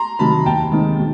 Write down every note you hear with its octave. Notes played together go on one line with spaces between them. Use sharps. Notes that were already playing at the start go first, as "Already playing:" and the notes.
Already playing: A#5 C6
C3 D#3 F#3 A5 B5
D#2 G5 A5
D#3 G#3 C4 D#4
B2